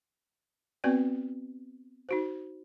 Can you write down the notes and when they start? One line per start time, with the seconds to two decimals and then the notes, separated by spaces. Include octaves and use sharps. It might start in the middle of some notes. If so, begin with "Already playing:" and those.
0.84 B3 C4 F#4 B4 D5 G#5
2.09 D#4 F#4 C5